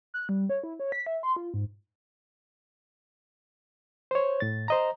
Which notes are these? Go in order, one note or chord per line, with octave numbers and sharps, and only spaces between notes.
F#6
G3
C#5
E4
C#5
B6
E5
C6
F4
G#2
C5 C#5
A2 A6
C5 D#5 A#5